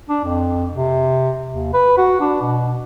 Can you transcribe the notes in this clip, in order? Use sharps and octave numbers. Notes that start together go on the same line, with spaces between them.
D4
F2
C3
D#2
B4
F#4
D4
B2